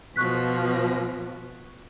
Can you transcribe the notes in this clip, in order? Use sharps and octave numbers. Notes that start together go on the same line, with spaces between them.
B2 F3 C#6 F#6 B6